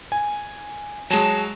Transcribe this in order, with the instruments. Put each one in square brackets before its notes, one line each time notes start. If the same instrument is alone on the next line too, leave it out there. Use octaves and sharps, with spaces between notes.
[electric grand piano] G#5
[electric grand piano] F#3 G#3 [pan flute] A5